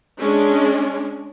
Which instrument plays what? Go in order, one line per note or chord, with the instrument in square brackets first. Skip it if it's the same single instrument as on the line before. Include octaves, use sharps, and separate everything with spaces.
[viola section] G#3 C#4 D4